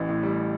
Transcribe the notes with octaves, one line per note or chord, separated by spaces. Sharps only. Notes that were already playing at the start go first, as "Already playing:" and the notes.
Already playing: A1 E3
A2
G3